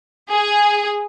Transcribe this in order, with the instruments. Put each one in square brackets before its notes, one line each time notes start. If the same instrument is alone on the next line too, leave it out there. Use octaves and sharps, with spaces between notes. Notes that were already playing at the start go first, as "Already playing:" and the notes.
[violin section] G#4